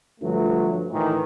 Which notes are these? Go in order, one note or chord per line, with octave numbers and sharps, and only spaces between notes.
G2 D3 F3 F#3 A3
A2 D#3 E3